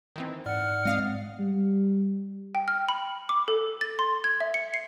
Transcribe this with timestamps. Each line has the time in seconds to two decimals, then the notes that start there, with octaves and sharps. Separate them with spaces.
0.16 D#3 E3 C4
0.46 G#2 D5 F#5 F6
0.85 G#3 C4 D#5 F5 D#6
1.39 G3
2.55 G5
2.68 F6
2.89 B5
3.29 D6
3.48 A4
3.81 A6
3.99 C6
4.24 G#6
4.40 E5
4.54 C#7
4.74 C7